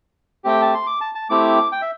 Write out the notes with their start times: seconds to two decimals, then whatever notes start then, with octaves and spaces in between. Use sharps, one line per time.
0.44 A3 C4 G4 G5
0.62 A5
0.74 C6
0.87 D6
1.01 A5
1.15 A5
1.30 A3 C4 E4 G4 D6
1.72 G5
1.82 E5